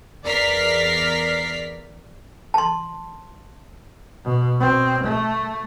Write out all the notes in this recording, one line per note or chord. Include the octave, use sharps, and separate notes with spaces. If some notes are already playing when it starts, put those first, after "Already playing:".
E2 A#4 D5 F6 B6 C7
A5 C6
B2
B2 C4
A3